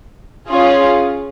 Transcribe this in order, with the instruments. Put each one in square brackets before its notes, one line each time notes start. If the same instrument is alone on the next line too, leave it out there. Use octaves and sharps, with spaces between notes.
[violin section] C#4 F4 G#4